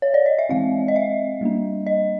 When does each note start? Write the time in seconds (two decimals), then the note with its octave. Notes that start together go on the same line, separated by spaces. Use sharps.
0.02 C#5
0.14 D5
0.26 D#5
0.39 E5
0.49 E3 G#3 C4 F5
0.88 D#5
0.96 E5
1.41 G3 A#3 D4
1.86 D#5